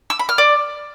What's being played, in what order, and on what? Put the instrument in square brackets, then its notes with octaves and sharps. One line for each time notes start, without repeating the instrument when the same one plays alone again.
[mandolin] E6
B5
F6
D5